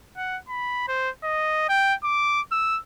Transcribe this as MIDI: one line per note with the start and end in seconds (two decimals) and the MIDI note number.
0.17 0.38 78
0.49 0.87 83
0.88 1.10 72
1.24 1.66 75
1.69 1.94 79
2.04 2.41 86
2.52 2.80 88